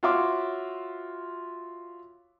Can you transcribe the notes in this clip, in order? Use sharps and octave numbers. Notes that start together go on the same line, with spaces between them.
F4 F#4 C#5 E5 C6 D6